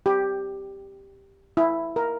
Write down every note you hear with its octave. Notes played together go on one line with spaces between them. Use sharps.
G4
E4
A#4